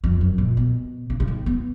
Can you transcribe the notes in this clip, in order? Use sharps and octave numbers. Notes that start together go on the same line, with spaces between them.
F2
F#2
A#2
B2
C#3
C#3
D#3
B3